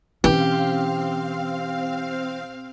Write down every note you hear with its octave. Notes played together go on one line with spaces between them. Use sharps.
B2 E3 C4 C#4 G4 F5